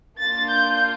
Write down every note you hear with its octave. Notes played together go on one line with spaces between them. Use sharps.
A#3 D4 F4 A6
G6